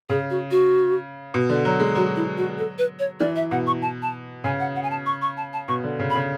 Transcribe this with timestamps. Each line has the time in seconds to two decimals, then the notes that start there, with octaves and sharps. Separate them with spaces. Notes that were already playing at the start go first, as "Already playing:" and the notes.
0.09 C#3 G#4
0.30 F#4
0.51 F#4
1.34 B2
1.49 D3
1.65 F#3
1.80 G#3
1.95 F#3 F#4
2.16 E4
2.37 F#4
2.58 A4
2.78 B4
2.99 C#5
3.20 E3 D5
3.36 E5
3.51 B2 F#5
3.67 C#6
3.82 A5
4.02 A5
4.44 C#3 G#5
4.60 F#5
4.76 F#5
4.83 G#5
4.90 A5
5.06 C#6
5.22 C#6
5.37 A5
5.53 A5
5.68 B2 C#6
5.84 D3
5.99 C#3
6.10 B5
6.15 C#3